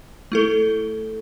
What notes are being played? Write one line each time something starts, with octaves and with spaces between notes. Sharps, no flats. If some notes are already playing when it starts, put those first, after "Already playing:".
A3 E4 A4